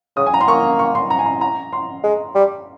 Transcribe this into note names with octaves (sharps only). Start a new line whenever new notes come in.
C#3 D#6
G#5
A#5
C6
A#3 C#6
C#6
C6
A#5
G#5
A#5
A#5
C6
G#3
G3